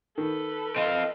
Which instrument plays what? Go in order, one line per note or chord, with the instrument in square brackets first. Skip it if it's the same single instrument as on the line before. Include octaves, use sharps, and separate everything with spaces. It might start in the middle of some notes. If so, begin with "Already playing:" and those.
[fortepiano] D#3 [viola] A4 B4
[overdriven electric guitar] C4 F4 [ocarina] D#5